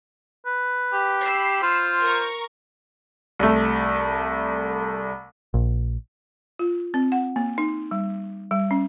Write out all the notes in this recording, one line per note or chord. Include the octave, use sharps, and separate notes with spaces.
B4
G4
B5 E6 C7
F4 C5
A#4 A#5 C#6
C2 A3
A#1
F4
C4
F#5
A#3
D#4
G3
G3
C#4